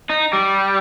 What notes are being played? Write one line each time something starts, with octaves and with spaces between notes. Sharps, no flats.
D#4
G3